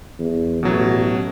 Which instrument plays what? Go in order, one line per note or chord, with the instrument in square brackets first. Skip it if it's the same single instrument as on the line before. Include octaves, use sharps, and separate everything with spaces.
[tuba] E2
[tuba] A1 [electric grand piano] B2 F#3